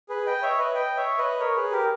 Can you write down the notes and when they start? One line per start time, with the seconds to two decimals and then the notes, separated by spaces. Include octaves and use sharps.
0.09 G#4 B4
0.26 D#5 G5
0.42 C#5 E5
0.59 B4 D#5
0.74 D#5 G5
0.97 C#5 E5
1.18 B4 D#5
1.40 A#4 C#5
1.56 G#4 B4
1.72 G4 A#4